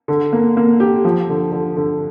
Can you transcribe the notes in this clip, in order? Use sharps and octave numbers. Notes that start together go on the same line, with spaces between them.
D3
A#3
A#3
G4
F3
D3
D3
D3